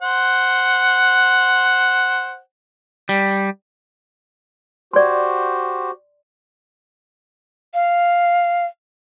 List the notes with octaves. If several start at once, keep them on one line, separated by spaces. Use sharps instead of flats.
C5 F#5
G3
F#4 G4 C5 D5 C6
F5